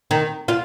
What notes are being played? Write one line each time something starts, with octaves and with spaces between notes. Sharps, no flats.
D#3
F4